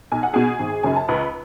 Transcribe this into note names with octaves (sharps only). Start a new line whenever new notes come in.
B1 G#5
F#5
B2 G#4 G#5
G#1
F#2 C#3 G#5
A5
C#2 B4 B5